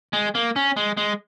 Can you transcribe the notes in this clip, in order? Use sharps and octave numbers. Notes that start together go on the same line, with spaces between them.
G#3
A#3
C#4
G#3
G#3